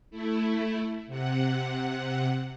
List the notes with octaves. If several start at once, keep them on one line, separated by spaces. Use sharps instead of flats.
A3 E4
C3 F#5